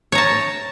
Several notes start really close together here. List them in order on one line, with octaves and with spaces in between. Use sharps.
C#5 A#5 A5